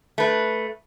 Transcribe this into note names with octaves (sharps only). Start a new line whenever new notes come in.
A3 B4